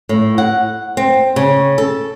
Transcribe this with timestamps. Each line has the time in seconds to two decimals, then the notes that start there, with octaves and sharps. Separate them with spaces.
0.09 A2
0.38 F#5
0.97 C4
1.36 C#3
1.78 A4